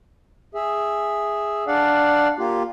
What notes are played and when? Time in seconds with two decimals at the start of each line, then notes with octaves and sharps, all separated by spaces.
0.55 G#4 E5
1.67 D4 D5 F5 F#5
2.39 A#3 F4 G4